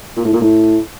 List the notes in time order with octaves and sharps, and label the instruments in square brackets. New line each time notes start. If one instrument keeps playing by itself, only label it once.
[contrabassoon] A#2
A2
A#2
A2